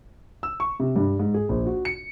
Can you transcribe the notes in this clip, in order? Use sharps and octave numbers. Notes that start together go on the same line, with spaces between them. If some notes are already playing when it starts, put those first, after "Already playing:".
E6
C#6
C3
G2
G#2
G#4
A#1
F#4
C#7